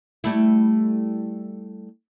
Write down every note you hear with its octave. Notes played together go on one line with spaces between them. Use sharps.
G3 A3 E4